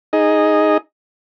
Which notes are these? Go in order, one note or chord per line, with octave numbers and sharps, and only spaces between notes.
D#4 G#4 D#5